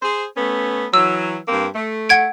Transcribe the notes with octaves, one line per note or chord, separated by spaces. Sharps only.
G#4 C5
A3 B3 C#4
E3 F#3 E6
G2 A#3 C4
A3
F#5 G#6 D7